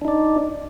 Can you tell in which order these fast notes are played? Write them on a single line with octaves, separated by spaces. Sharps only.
D4 D#4 D5